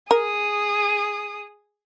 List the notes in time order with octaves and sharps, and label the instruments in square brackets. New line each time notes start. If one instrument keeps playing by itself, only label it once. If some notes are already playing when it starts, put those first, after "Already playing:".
[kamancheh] G#4 D#6 [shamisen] A#4